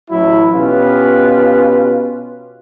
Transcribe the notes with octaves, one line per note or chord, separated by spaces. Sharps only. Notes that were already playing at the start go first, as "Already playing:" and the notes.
A1 F#3 E4
B2 C#4 F4 G4 B4